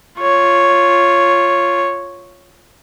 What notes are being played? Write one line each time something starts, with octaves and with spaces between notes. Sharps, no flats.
F4 C#5